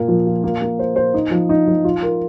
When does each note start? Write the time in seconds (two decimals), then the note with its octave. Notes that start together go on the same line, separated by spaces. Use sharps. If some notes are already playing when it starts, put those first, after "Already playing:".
Already playing: A#2 A#3
0.08 F3
0.26 F4
0.44 A#3
0.62 A#3
0.79 C5
0.96 C5
1.14 D#4
1.31 F3
1.49 D#4
1.67 F3
1.84 F4
2.03 A#4